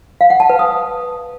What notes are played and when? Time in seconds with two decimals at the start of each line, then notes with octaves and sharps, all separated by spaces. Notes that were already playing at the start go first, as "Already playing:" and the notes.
0.21 F5
0.30 F#5
0.40 A5
0.50 B4
0.59 D#6